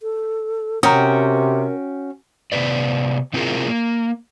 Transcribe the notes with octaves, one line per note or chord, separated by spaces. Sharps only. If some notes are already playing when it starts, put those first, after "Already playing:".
A4
C3 C#4 F#4 A#4 G5 A#5 D#6
C3 B3 B4 D5
C3 C4 E4 F4 G#4 A#4
A#3